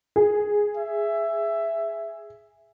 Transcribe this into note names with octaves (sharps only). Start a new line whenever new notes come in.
G#4
E5